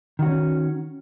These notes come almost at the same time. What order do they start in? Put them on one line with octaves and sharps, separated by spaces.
D#3 F#4 C#4